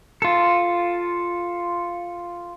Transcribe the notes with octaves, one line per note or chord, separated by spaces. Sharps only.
F4 A4